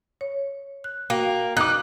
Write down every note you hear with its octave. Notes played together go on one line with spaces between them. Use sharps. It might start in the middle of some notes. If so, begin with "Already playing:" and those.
C#5
F#6
A#3 F#4 G5
D#4 D6 F#6